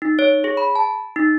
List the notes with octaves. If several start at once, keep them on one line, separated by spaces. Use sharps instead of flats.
D#4
C#5
G#4
B5
A5
D#4